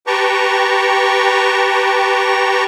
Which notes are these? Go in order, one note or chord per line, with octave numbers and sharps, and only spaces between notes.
G4 B4 G5 A5 A#5 C#6